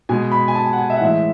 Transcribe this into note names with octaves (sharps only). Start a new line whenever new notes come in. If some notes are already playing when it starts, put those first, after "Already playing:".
B2 G#3 G#5
B5
G#5
A5
G#5
F#5
G#5
E5
F#5
A2 E3 G#3 E5